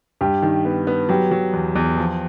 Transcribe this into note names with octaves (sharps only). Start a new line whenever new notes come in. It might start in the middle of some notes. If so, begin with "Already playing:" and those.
G2 G4
D#3
B3
B3
F#3 G4
F#3
E2
E2
F3